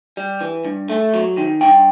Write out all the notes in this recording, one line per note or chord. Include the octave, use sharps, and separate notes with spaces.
G3
E3
G2
A3
F#3
D#3
G2 G5